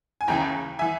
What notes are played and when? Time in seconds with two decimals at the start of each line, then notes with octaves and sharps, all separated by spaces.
0.21 G#5
0.28 D#2 C#3 E3 G5 A#5
0.79 E3 E5 G#5